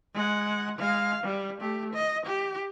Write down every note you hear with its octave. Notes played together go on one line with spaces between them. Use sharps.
G#3 F#5
G#3 F5
G3
A3 G4
D#5
G4